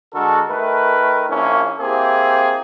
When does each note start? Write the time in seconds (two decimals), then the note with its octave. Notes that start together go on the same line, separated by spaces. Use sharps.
0.14 D3 G#3 F#4 A4 A#4
0.49 D#3 A3 A#4 B4
1.29 A#1 A#3 C#4 E4
1.80 A#3 C4 E4 G4 G#4